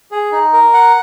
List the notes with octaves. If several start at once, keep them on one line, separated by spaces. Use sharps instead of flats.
G#4
D#4
A#4
F#5